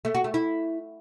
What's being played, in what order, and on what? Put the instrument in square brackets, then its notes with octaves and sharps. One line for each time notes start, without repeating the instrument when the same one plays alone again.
[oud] A3
F#4
A3
E4